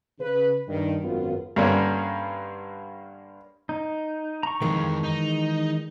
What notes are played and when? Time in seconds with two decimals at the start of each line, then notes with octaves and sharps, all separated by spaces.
0.19 C#3 B4
0.68 G2 D#3
1.02 G#1 F#2 B3 F4
1.56 G2 D3 A#3 C#4
3.69 D#4
4.43 A#5 C#6
4.62 F2 D#3 E3 G#3
5.03 D#4